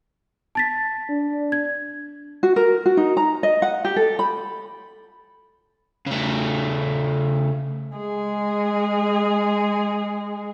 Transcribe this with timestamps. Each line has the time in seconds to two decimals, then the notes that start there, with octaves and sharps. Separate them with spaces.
0.55 A5 A6 B6
1.10 D4
1.52 G#6
2.43 F#4
2.56 A#4
2.86 F#4
2.97 D#4
3.17 A#5
3.43 D#5
3.62 F#5
3.85 G4
3.96 A4
4.19 B5
6.07 C#3 A3
7.93 G#3 G#4